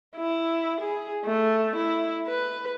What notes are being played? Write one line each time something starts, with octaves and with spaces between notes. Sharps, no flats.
E4
G#4
A3
E4
B4